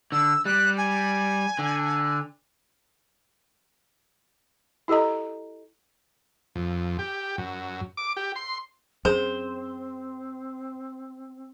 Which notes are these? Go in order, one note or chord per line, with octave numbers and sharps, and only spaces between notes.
D3 E6
G3 F#6
G#5
D3
E4 G4 A4 D#5 A#5
F2
G4
F#2
D6
G4
C6
F#2 C4 G#4 C5